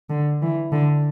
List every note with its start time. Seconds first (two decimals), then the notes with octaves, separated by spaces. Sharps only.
0.10 D3
0.42 E3
0.72 D3